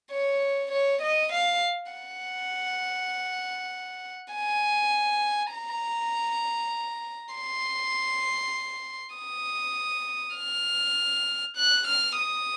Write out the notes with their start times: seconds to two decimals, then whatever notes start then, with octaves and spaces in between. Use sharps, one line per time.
0.11 C#5
0.72 C#5
1.01 D#5
1.32 F5
1.92 F#5
4.34 G#5
5.54 A#5
7.35 C6
9.15 D#6
10.36 F6
11.57 F#6
11.87 F6
12.17 D#6